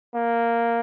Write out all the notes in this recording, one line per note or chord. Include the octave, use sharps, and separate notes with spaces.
A#3